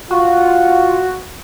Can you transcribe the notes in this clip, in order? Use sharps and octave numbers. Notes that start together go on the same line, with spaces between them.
F4 F#4